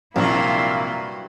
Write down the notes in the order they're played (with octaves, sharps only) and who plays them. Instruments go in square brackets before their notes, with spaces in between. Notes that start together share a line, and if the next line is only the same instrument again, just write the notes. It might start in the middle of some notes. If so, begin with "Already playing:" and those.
[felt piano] A#1 C3 F3 [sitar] G2 F#3 [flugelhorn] A#3 [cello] E4 F4